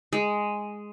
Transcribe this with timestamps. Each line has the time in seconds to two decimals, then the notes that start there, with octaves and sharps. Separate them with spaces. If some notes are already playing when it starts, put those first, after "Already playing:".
0.13 G#3